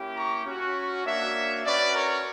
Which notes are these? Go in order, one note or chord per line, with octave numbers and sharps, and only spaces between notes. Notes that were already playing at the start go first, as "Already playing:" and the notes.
Already playing: A#3 C#4 E4 G4
A#5 C#6
C#4 F#4
A#3 D4 F#4 C#5 E5
C#4 F#4 B4 D5
A#4 C#5